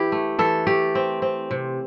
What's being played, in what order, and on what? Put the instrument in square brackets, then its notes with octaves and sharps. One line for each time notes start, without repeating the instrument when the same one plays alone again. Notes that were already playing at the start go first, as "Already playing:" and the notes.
Already playing: [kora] E3 E4 G4
A3
E3 A4
A3 G4
C4
C4
C3